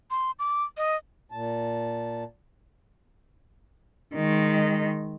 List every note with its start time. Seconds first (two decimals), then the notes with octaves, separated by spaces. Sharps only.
0.11 C6
0.39 D6
0.77 D#5
1.32 A#2 A5
4.15 D#3 G#3